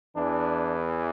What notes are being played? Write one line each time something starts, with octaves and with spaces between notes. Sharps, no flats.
E2 E3 D4